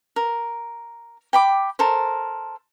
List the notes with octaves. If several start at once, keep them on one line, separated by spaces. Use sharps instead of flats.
A#4
G5 B5 D6
A4 A#4 C5